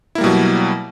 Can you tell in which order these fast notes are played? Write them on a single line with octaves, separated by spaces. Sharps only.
E4 A#3 G3 B2 F#3